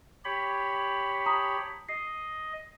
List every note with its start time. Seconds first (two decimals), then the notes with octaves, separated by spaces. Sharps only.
0.25 G4 C#5 B5
1.26 A5 A#5 D#6
1.89 D#5 C7